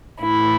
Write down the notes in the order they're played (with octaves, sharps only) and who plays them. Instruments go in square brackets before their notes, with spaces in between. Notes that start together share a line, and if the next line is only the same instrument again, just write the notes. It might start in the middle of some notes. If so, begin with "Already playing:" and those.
[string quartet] A2 E3 E4